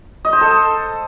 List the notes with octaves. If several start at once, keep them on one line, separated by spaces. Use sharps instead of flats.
D#5
C5
A4